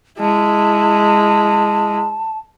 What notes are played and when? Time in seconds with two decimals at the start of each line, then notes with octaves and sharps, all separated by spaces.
0.19 G#3 E4 A5